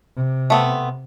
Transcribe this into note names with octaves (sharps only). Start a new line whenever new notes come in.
C3
A3 B3 C4